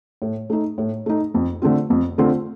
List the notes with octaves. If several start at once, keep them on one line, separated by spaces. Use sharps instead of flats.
A2
A3 D#4
A2
A3 D#4
F2
D3 A3 C4 F4
F2
D3 A3 C4 F4